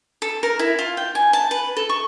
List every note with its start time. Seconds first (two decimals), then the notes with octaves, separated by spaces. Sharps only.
0.22 A4
0.43 A#4
0.59 E4
0.79 F4
0.97 G5
1.15 G#5
1.33 A5
1.51 B4
1.77 A4
1.89 C#6